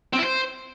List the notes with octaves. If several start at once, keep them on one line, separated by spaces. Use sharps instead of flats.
C4
E4
C5